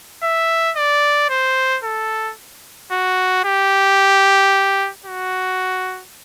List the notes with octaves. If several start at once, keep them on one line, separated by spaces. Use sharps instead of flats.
E5
D5
C5
A4
F#4
G4
F#4